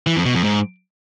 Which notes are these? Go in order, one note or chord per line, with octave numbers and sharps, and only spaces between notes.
E3
F2
B2
F2
G#2